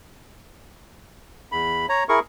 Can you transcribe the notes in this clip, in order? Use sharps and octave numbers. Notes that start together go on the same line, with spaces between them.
E2 B5
C#5 A#5
E4 G#4 A#4 C#6